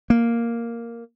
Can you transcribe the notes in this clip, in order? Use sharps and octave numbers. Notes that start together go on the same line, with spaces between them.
A#3